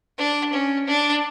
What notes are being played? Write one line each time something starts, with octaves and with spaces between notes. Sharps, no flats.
D4
C#4
D4